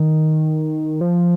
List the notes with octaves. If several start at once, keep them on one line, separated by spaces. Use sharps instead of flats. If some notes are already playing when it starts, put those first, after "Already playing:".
Already playing: D#3
F3